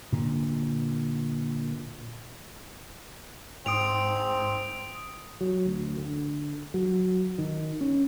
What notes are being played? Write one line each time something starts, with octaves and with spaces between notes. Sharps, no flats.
A#2 D3
G#2 C4 D#6 D7 F7
F#3
D2
D3
F#3
D#3
C#4